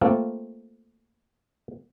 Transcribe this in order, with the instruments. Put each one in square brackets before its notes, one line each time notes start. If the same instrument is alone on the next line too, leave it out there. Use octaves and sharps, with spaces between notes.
[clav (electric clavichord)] A3 A#3 C4 F4